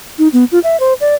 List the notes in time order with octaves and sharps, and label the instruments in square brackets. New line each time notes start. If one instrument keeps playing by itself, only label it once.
[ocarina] D#4
B3
F4
E5
C5
D5